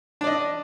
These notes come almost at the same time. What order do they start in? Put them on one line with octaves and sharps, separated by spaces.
D4 D5 D#5